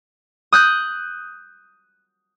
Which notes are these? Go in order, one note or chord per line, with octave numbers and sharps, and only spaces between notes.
D#6 F#6 G6